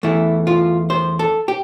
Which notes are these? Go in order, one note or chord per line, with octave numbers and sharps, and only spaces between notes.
E2 E3 A3 E4
F4
C5
A4
G4